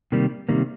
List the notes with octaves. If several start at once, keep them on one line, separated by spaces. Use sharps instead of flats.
C3 D#3 G3 A#3
C3 D#3 G3 A#3